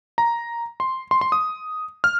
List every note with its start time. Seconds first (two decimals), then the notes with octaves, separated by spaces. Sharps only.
0.18 A#5
0.80 C6
1.11 C6
1.21 C6
1.32 D#6
2.04 F6